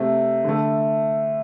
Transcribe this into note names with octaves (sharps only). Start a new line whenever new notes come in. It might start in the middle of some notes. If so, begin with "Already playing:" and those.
Already playing: C3 A3
D3 A3